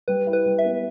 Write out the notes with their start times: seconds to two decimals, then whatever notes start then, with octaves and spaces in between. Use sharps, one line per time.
0.08 G3 B4
0.27 E4
0.33 B4
0.46 G3
0.59 E5
0.65 B3